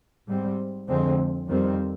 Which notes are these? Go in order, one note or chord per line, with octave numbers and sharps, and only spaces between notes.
G#2 G3 C4
F2 D3 G#3 C4
F2 D#3 G3 C4